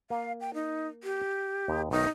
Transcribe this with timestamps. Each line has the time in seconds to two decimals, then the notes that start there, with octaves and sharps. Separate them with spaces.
0.10 A#3 F5
0.41 G5
0.54 D#4
1.04 G4
1.68 D#2 D#4
1.91 B1 D#3 A3 D#4